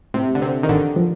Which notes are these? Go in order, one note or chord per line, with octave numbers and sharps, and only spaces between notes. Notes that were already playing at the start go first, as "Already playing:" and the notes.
A2 C3
D3
C3 C4
D#3
A1 D3
F3